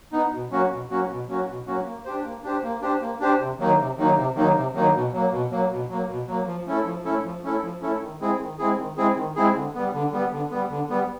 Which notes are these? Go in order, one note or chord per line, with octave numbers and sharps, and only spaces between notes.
B3 D#4
B2
F#3 A#3 C#4 F#4
B2
F#3 A#3 C#4 F#4
B2
F#3 A#3 C#4 F#4
B2
F#3 A#3 C#4 F#4
A#3
D4 G4 C5
A#3
D4 G4 C5
A#3
D4 G4 C5
A#3
D4 G4 C5
C3
D#3 F#3 A#3 D#4
C3
D#3 F#3 A#3 D#4
C3
D#3 F#3 A#3 D#4
C3
D#3 F#3 A#3 D#4
B2
F#3 A#3
B2
F#3 A#3
B2
F#3 A#3
B2
F#3 A#3
F3
A3 C#4 E4 A4
F3
A3 C#4 E4 A4
F3
A3 C#4 E4 A4
F3
A3 C#4 E4 A4
D#3
G#3 C4 E4 G#4
D#3
G#3 C4 E4 G#4
D#3
G#3 C4 E4 G#4
D#3
G#3 C4 E4 G#4
D3
G3 B3
D3
G3 B3
D3
G3 B3
D3
G3 B3